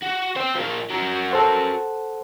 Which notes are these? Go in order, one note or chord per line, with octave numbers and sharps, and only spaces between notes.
F#4
C5 G5
F3 A#4
F#4 A#4
A4 C5 F#5